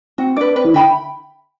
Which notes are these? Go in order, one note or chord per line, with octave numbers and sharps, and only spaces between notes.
C4 F#4
D4 B4 D5
C4 B4
E3
D3 E5 G5 B5